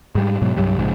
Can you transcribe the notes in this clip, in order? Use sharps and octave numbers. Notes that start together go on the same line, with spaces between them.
G#2 G3
G#2 B2 F#3
C2 G2 F#3 G3
A#1 G#2 C#3